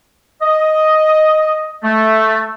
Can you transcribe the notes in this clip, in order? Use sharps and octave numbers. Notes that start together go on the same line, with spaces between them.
D#5
A3